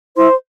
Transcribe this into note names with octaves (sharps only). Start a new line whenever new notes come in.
E4 C5 C6